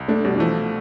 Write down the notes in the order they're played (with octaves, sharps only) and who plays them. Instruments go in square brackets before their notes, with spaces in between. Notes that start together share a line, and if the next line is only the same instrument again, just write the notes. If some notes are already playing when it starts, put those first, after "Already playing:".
Already playing: [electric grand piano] C2
[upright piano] A3 [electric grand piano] D4
[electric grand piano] B2 [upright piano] G3
[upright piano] E3
[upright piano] F3 [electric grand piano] A3